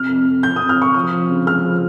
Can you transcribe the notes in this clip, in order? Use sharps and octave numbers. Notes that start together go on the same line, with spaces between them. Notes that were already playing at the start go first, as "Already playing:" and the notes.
Already playing: C3 F6
F2
F2
F2 G6
C3 D#6
F6
C3 C#6
F3 D#6
F3
C#3
G#3 F6
F3